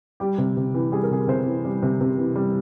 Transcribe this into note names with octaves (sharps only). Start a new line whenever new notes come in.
G3 G4
C3
C3
E3
G3 G#4
A#4
C3 G#4
C3 C5
E3
G3
C3
C3
E3
G3